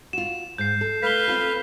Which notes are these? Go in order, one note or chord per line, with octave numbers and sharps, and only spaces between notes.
F4 F#4 E7
G#2 G6 C7
A4
A3 B4 F5 B6 G7
C4 F4 A4